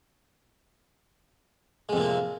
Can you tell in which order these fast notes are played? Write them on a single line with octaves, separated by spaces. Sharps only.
G#3 F2 C3 A#3